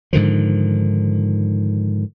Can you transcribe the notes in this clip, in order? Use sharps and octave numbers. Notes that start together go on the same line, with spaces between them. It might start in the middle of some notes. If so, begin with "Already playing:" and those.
G#2 D3 D#3 F3